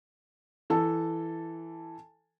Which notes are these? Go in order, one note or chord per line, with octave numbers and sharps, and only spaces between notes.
E3 A4 A5